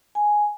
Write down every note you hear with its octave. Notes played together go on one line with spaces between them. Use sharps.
G#5